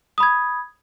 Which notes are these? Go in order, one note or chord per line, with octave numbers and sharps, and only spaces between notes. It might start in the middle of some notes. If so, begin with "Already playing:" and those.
B5 D#6 G#6